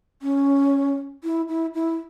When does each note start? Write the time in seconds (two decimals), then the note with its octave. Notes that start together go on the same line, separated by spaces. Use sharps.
0.22 C#4
1.24 E4
1.49 E4
1.75 E4